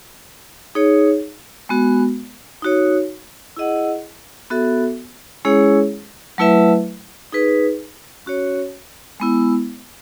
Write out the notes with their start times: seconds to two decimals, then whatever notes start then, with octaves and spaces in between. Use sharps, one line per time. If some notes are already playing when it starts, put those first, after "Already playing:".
0.75 D#4 G#4 C#5
1.69 G#3 B3 F#4
2.62 D#4 F#4 C#5
3.57 E4 G#4 D#5 F#5
4.50 B3 F#4 A4 E5
5.45 G#3 C#4 E4 G#4 C#5
6.38 F#3 A3 E4 B4 E5
7.32 D#4 G#4 B4
8.26 C#4 F#4 C#5
9.20 G#3 B3 E4